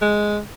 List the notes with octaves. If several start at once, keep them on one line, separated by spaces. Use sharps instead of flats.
G#3